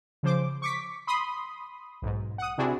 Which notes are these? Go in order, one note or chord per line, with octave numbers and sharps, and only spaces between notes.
C#3 F3 C5 D6
C#6 D6 B6
B5 C6 D#6
B1 G#2
F#5 D#6
C3 C4 D4 E4 F#4 G#4